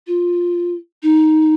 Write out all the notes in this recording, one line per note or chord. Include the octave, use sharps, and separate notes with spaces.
F4
D#4